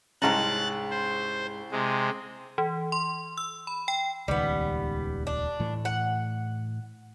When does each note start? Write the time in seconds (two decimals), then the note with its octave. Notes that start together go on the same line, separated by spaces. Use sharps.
0.22 C2 G#2 G#3 C#4 A5 A#5 F#6 A6
0.90 C5
1.72 C3 G#3
2.58 E3
2.92 C6
3.38 E6
3.67 B5
3.88 G5
4.28 D#1 C#2 D#3 G3 B3
5.27 D4
5.60 A2 E3 A3
5.85 F#5